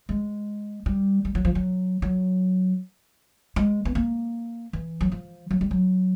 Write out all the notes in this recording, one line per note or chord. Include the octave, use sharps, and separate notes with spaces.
G#3
G3
G3
F#3
F3
F#3
F#3
G#3
B3
A#3
E3
F#3
F3
F#3
G3
F#3